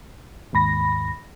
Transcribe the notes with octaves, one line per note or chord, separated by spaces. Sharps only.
D#2 G#2 B5 A#6